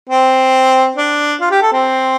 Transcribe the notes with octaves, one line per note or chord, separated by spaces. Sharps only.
C4
D4
F4
G4
A4
C4